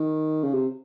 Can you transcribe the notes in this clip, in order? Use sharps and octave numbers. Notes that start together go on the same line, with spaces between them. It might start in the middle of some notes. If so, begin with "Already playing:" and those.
Already playing: D#3
C#3
C3